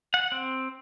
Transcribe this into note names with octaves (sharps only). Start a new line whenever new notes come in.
F#5
C4